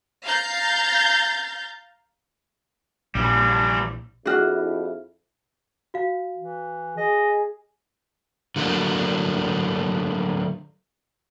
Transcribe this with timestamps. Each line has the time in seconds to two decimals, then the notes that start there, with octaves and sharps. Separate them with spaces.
0.24 F5 A#5 G6 A6
3.15 A#1 E3 G3
4.26 F2 D4 E4 F#4 G#4 F6
5.94 F#4 F5
6.37 E3
6.98 G#4 D#5
8.56 D3 F#3 A3 A#3